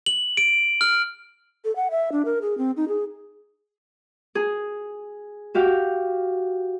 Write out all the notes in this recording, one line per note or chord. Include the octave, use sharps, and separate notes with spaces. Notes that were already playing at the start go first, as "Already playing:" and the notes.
F#7
D7
F6
A4
F#5
E5
D4
A#4
G#4
C4
D#4
G#4
G#4
F#4 G4 F5